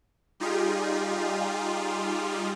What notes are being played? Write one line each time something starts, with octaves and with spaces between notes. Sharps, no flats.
G3 D#4 F4 G4 G#4